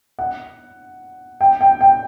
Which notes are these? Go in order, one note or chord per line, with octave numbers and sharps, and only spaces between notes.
F#5
G5
G5
G5